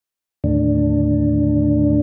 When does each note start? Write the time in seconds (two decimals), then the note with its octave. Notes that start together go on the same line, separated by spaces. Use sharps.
0.44 D#2 A2 D3 D4